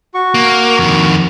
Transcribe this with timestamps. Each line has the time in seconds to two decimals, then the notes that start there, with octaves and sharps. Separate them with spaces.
0.14 F#4 C#6
0.34 A#3
0.79 F2 D#3